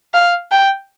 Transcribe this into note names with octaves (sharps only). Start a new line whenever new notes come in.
F5
G5